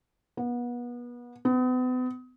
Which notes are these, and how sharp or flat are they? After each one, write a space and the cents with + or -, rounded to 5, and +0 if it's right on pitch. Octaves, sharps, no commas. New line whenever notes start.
B3 -30
B3 +40